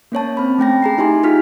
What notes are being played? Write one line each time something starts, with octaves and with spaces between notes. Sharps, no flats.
A#3 C#4 C#5 A5
C4 B5
A3 C#4 G5 A#6
G#4 A#5 C7
D#4 E4 G4 G#5 C6
D#4 F4 G4 F6 B6